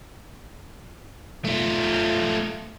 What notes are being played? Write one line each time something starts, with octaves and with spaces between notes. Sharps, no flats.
A3 F4